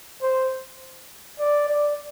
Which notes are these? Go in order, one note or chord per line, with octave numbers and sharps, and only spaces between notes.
C5
D5
D5